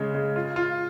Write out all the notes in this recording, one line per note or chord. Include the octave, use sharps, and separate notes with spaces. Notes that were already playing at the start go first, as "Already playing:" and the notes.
Already playing: C#3 G#3
G#3
F4
F4